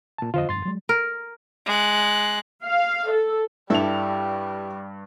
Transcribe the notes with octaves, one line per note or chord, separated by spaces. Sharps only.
A#2 A5
F2 D3 F4 C5 D#5
F1 G2 C6 A6
F#3 G#3
A#4
G#3 F#6
F5
A4
G2 G3 E4 A4 E6 F7